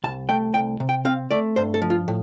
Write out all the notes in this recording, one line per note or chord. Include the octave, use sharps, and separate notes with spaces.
C2 A5
A3 G5
C2 G5
C3
G5
C4 F5
A3 D5
G2 C5
A4
F3
F4
A2